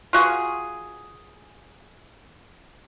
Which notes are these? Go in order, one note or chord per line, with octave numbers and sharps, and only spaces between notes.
F4 F#4 G#4